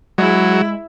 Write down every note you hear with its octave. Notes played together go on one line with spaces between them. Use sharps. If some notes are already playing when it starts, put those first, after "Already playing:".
F#3 G#3 E4